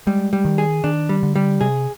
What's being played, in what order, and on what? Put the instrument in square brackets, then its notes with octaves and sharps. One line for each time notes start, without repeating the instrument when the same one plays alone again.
[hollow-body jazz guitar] G3 [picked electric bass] G#3
[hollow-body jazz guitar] G3
[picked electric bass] D#3
[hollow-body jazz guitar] G#4
[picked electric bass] D#3 [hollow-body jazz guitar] D4
[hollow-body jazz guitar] G3
[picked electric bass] D3
[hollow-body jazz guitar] G3
[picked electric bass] C3 [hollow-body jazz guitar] G#4